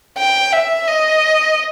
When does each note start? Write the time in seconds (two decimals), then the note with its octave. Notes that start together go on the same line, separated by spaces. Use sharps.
0.18 G5
0.53 E5
0.88 D#5